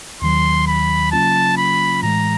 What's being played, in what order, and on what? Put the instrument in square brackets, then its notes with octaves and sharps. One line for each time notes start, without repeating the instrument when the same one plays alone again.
[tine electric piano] D#2 D#3 F#3 [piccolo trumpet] C6
[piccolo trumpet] B5
[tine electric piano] C#3 F#3 A#3 C#4 F4 [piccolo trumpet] A5
[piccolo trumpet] B5
[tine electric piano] A2 E3 G#3 [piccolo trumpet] A#5